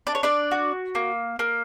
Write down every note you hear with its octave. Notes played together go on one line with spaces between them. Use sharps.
D4 D5
C#5
D4 D5
F#4
A#3
A#3